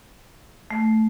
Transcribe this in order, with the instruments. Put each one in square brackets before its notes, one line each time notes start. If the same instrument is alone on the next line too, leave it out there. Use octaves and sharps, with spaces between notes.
[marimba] A3